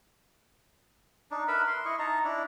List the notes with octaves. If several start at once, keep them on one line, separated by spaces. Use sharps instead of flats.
D4 D#4
A#4 B4 E5 B5
C6
E4 D#5 C#6
D#4 A5 A#5
D4 E4